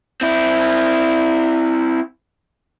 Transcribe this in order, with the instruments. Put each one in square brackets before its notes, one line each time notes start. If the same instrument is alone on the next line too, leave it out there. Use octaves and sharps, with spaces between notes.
[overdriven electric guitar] C4 E4